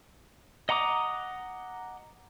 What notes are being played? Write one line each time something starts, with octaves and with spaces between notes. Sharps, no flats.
D#5 F#5 A#5 D6 D#6